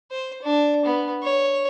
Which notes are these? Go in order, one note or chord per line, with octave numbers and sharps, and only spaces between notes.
C5
D4
B3
C#5